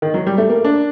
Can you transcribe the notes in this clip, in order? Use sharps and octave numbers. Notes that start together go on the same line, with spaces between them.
D#3
F#3
G3
A3
A#3
D4